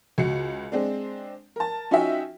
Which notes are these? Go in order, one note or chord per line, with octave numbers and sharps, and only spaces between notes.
C#2 F#4 C#7
G#3 C4 D4
A#4 A5
C#4 D#4 F4 F#4 E5 G5